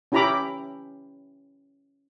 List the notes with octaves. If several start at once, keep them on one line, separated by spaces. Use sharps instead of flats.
C#4 E4 G4 A#5 B5 D6